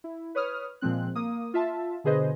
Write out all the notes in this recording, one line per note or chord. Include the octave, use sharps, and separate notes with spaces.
E4
B4 C#5 D#6 F6
A#2 F3 G#3 C4 F#6
A#3 D#6
F4 E5 A5
B2 D3 G#4 B4 C5 D#5